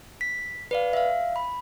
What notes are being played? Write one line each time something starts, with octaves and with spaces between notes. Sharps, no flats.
B6
B4 D5 F5
E5 F5
B5